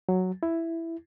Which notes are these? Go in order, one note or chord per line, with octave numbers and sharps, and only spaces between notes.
F#3
E4